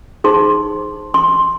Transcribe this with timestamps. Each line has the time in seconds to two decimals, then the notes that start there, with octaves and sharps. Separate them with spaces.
0.24 D#4 G#4 C5 C6
1.14 C6